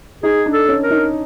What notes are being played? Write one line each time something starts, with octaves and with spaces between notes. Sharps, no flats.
D#4 G#4
D4
A4
C#4
A#4
D#4